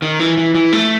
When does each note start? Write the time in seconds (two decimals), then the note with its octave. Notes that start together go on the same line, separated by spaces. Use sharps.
0.02 D#3
0.20 E3
0.37 E3
0.55 E3
0.72 A3